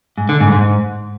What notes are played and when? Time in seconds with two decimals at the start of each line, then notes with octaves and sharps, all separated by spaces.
0.18 G#2
0.29 D3
0.40 G#2
0.52 G#2